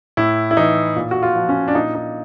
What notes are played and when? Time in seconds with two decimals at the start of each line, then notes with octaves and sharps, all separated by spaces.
0.17 A2 E4
0.51 E4
0.57 E3 D#4
0.96 A#2
1.11 F#4
1.23 F4
1.36 F3
1.49 C#4
1.68 D4
1.75 A#2 D#4
1.95 D#4